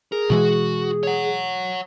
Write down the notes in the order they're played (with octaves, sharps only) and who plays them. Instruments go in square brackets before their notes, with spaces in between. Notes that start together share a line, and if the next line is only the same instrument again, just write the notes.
[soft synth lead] G#4 [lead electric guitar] A#4
[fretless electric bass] B2 E3 G#3 [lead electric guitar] F#4
[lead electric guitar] C#5 F#5